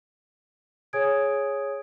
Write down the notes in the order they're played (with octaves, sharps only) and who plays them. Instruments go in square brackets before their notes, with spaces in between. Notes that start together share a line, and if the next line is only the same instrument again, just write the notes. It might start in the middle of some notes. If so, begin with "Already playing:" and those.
[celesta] G#4 C#5 G#5 D#6 G#6 D7